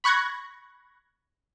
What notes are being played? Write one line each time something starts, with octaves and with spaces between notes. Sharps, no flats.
B5 C#6 F#6 G#6 A#6